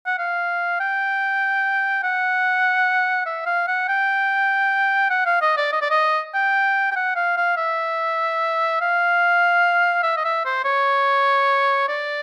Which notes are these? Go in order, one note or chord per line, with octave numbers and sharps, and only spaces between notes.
F#5
F5
G5
F#5
E5
F5
F#5
G5
F#5
F5
D#5
D5
D#5
D5
D#5
G5
G5
F#5
F5
F5
E5
F5
E5
D#5
E5
C5
C#5
D5